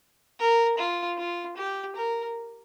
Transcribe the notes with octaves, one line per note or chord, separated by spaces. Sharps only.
A#4
F4
F4
G4
A#4